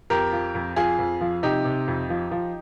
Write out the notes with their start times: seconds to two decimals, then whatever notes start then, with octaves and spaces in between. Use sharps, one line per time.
0.10 F2 G4 A#4
0.33 F3
0.55 F2
0.76 F3 F4 G#4
0.99 F2
1.21 F3
1.43 C3 D#4 G4
1.65 C3
1.88 F2
2.10 F3
2.31 F3